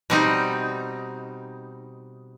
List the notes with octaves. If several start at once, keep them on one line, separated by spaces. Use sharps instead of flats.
B2 G3 C4 D#4